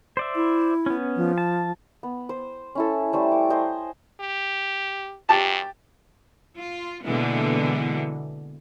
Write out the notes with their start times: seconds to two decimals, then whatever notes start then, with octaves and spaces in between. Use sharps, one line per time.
0.17 C5 D5 E5
0.36 E4
0.86 B3 C#4
1.16 F3
1.38 A5
2.03 B3
2.29 C5
2.75 C#4 E4 A4
3.13 G3 A3 C5
3.32 D6
3.50 C5 D#5 G#5
4.20 G4
5.29 F#2 G4 A5
6.57 F4
7.04 B2 D3 E3 G#3 A#3 B3